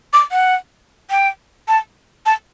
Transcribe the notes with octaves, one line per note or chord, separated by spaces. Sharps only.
D6
F#5
G5
A5
A5